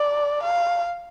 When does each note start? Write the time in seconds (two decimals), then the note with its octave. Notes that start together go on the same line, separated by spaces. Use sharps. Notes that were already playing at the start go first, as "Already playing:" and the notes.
Already playing: D5
0.43 F5